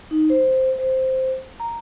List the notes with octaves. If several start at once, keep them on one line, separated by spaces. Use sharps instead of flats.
D#4
C5
C5
A#5